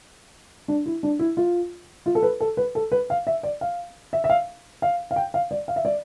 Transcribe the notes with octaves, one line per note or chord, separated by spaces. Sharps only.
D4
E4
D4
E4
F4
F4
A4
B4
A4
B4
A4
B4
F5
E5
D5
F5
E5
E5
F5
F5
F5
G5
F5
D5
F5
E5
D5